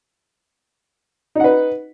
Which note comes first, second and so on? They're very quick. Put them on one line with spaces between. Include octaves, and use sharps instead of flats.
D#4 F#5 B4